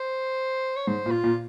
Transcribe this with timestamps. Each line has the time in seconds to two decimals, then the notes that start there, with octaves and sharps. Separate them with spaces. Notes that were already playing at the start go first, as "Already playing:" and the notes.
Already playing: C5
0.76 C#5
0.87 G#2 C5
1.06 A#2
1.11 F4
1.24 A#2